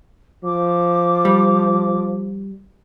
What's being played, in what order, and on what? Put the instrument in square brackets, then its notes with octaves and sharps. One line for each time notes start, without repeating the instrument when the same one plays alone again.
[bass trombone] F3 [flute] D6
[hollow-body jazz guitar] G3